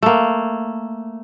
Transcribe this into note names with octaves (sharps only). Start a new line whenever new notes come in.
A3 A#3